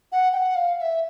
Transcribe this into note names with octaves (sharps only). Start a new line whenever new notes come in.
F#5
G5
F#5
F5
F5
E5